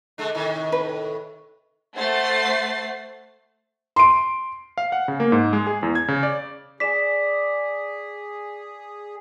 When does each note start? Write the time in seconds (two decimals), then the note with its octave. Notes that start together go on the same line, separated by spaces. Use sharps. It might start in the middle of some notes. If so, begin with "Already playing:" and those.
0.18 D3 G#3 D4
0.35 A2 C3 D#3
0.72 B4
1.95 A3 C5 F#5 A6 C7
3.96 C6 D7
4.78 F5
4.92 F#5
5.08 C#3
5.20 A#3
5.32 G#2
5.53 G#3
5.67 G#4
5.83 E2
5.95 G#6
6.08 C#3
6.23 D5
6.80 G#4 D5 G#5 B6 E7